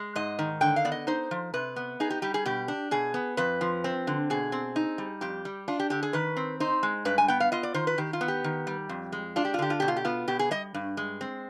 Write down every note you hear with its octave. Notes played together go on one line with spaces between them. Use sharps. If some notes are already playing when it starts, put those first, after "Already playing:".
Already playing: G#3
G#2 D#5
D#3
D3 G5
F5
B3 D5
D#5
D#4 C5
F3
C3 B4
B3
D#4 G#4
G4
G3 G4
G#4
B2 G4
D4
B2 G#4
B3
F2 B4
F3
C4
D3
B2 G#4
C4
D#4
G3
F2 G4
G3
D4 F4
G4
D3 G4
G#4
D#3 B4
C4
D#4 C5
G#3
G2 B4
G#5
B3 G5
F5
F4 D#5
D5
D#3 C5
B4
D#3 G4
F4
B3
G4
D#3
G3
F2
G#3
D4 F4
G4
F4
D3 G4
F4
B2 G4
F4
G4
B3 F4
B2 G4
G#4
G3 D#5
G2
G#3
C4